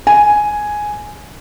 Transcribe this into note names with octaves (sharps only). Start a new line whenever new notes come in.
G#5